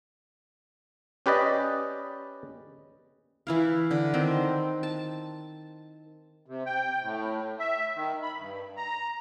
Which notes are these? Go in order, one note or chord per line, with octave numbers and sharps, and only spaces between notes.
C#4 G4 B4 D5 D#5
E3 E4 F5
D3
D#3 C4
A5
C3
G5
A2
E5
D#3
B5
G2
A#5